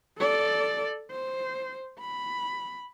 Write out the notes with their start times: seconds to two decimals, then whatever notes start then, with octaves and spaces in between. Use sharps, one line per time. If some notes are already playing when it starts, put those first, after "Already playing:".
0.18 A4 D5
1.12 C5
2.00 B5